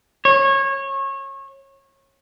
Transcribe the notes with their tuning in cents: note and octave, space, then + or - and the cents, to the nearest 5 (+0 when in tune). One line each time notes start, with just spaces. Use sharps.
C#5 -25